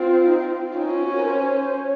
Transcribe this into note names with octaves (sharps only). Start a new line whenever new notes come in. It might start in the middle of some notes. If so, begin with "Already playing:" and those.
Already playing: C4 F4
D#4
F4
F4
F4
C#4 D#4
F4
F#4
A#4
C#5
C5
C#5